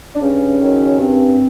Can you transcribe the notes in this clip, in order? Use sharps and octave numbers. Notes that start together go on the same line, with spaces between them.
D4
G2 C#3 C#4
D#3 F#3
G2 C4